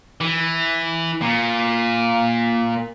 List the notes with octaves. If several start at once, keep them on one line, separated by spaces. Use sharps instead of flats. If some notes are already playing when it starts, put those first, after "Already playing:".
E3
A#2